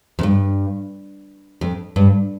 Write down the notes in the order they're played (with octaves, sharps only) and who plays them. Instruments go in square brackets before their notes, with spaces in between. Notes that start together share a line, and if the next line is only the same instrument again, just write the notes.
[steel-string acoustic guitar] F2
G2
F2
G2